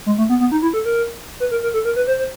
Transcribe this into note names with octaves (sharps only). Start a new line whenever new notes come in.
G#3
A3
B3
B3
D#4
E4
A4
A#4
B4
A#4
A#4
A4
A#4
B4
C5
C5